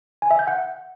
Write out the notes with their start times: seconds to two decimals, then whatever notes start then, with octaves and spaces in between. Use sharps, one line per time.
0.22 G#5
0.31 E5
0.39 G6
0.47 F#5